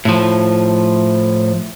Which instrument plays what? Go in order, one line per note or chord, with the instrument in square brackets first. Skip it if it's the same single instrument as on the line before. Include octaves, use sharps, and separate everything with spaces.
[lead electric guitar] A2 F3